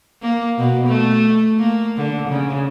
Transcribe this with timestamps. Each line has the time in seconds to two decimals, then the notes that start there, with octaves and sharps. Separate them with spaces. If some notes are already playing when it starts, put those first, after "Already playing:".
0.22 A#3
0.58 B2
0.88 A3
1.59 A#3
1.97 D3
2.29 C#3